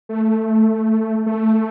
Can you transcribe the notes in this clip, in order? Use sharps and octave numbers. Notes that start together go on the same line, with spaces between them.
A3
A3